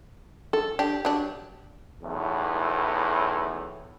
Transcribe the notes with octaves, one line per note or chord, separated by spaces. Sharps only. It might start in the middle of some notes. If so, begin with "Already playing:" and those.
A4
D4 G4
F#3 D4
B1 E2 A2